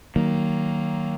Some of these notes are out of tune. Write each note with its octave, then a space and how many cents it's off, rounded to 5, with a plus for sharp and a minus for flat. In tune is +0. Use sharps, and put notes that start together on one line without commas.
D#3 +0 F#3 +25 A#3 +0